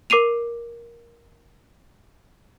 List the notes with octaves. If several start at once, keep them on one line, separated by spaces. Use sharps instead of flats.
A#4 D6 C7 D#7 F7